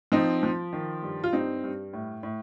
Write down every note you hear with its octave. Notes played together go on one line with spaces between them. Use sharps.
F3 C4 D#4
F3
D#3
G2
F4
G2 C4 D#4
G2
A2
A2